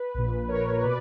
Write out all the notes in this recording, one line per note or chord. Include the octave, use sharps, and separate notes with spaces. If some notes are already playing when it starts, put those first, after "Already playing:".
Already playing: B4
A#1 A#2
A#4 C#5
B2 B4 D5